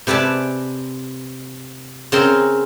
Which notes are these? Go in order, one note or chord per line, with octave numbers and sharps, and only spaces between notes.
C3 B4 D5 G#5 A5
C#3 C4 A#4